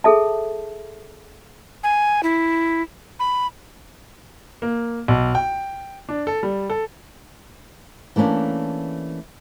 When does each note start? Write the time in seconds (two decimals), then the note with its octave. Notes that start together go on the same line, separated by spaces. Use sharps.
0.04 G#4 A4 E5 A5
1.83 G#5
2.23 E4
3.20 B5
4.62 A#3
5.08 B1
5.35 G5
6.09 D4
6.27 A4
6.43 G3
6.70 A4
8.16 E3 A3 A#3 C#4 D4